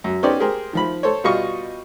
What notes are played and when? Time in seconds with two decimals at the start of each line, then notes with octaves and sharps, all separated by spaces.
0.04 F#2
0.23 B3 C#4 D#4 G4 C5 D5
0.40 G4 G#4 A#4 C5
0.73 D#3 F3 B5
1.03 A4 C5 C#5
1.24 B2 G3 F4 D#5 C#6